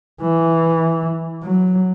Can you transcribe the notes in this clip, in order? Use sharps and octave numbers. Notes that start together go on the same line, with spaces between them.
E3
F#3